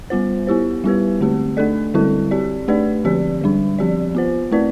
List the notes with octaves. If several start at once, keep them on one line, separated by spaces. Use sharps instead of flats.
G3 B3 F4 C5
B3 E4 G4 C5
G3 B3 E4 G4 B4
D3 A3 C4 G4
A3 D4 A4 D5
D3 G3 C4 E4 A4
C4 G4 D5
A3 D4 G4 B4 D5
D3 F3 C4 G4 D5
D3 G3 D4
F3 C4 G4 D5
B3 F4 C5
A3 C4 E4 B4 D5